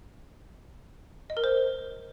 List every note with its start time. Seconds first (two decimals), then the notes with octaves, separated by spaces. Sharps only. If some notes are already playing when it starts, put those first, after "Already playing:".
1.30 D#5
1.37 A#4
1.44 C5